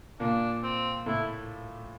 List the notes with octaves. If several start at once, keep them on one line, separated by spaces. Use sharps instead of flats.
A#2 A#3 D4
C4
A2 A3 E4